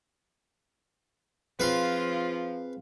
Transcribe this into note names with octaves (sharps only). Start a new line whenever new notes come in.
F3 C4 F4 G#4 B4 F5 C6